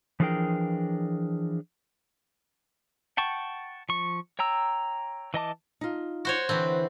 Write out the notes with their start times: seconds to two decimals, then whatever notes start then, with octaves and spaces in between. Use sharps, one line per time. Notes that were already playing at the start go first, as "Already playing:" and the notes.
0.20 E3 F3 D4 G#4 A#4 G5
3.17 F#5 G5 A5 C#6
3.89 F3 C#6
4.39 C#5 G5 A#5 E6
5.34 E3 D#5 A5 D6
5.81 D#4 F4
6.25 F#4 C5 C#5
6.49 D3 E3 C4